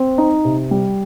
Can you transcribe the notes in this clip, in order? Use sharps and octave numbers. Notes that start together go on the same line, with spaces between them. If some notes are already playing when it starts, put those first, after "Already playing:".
Already playing: C4
D#4
C3
G3